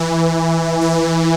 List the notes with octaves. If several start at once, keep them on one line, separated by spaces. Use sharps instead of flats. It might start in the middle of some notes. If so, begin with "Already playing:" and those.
Already playing: E3
E3